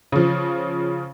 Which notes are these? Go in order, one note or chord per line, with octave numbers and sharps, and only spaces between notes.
C#3 F3